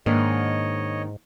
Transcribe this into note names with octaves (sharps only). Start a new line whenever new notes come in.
G#2 D#3 A#3 D4 C#5 D#5